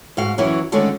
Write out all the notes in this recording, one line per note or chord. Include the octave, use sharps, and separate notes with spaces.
G#2 F#4 F5
F#2 E3 F#3 C#4 E4
D2 D3 D#3 G#3 A3 C#4